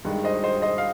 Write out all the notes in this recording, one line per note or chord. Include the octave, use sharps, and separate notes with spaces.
G2 D#3 G#3
C5 D#5
C5 D#5
C5 D#5
F5